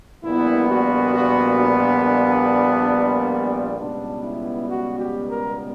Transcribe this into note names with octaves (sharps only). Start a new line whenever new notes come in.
A#1 A#2 G3 B3 E4
F#4
F#4
D4
C#2 B2 G3 B3 D4
E4
F#4
G4
A#4